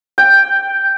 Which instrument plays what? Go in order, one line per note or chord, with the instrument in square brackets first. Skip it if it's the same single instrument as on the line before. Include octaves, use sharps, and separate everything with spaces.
[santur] G5